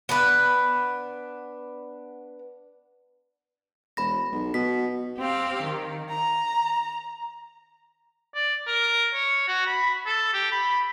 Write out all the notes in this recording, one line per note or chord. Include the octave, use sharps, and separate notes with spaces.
B3 D4 B4
E1 B5 A#6
B1
B2 B6
C4 G4 F5
D#3
A#5
D5
A#4
C#5
F#4
B5
A4
G4
B5